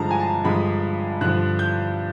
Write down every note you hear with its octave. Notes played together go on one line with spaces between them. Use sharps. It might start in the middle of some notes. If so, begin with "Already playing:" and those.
Already playing: G2 D3 F3 G#3 A5 A#5
G#5
A5
G2 D3 F3 G#3 B5
G2 D3 F3 F#6
G6